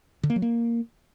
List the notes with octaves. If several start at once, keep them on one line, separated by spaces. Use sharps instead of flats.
D3
A#3
F#3
A#3